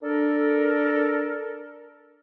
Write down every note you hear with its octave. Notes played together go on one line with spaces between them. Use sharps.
D4 A4 A#4